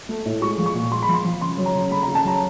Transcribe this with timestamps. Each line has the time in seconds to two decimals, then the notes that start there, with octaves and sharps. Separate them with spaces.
0.09 A3
0.25 A2
0.42 G#3 C#6
0.58 F3
0.66 C#6
0.74 A#2
0.91 G#3 C6
1.02 B5
1.08 F3
1.14 C6
1.24 F3
1.41 C#3 C6
1.58 F#3
1.66 A#5
1.75 C#3
1.91 A3 B5
2.03 C#3 A#5
2.15 A5
2.24 F#3 A#5